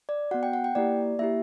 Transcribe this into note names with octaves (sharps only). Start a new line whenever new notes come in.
D5
B3 F#4 F#5
G5
F#5
G5
A#3 E4 G4 D5
A#3 E4 G4 E5